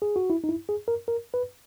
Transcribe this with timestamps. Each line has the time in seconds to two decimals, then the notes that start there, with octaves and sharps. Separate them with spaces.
0.02 G#4
0.16 F#4
0.30 E4
0.44 D#4
0.49 E4
0.69 G#4
0.88 A#4
1.08 A#4
1.34 B4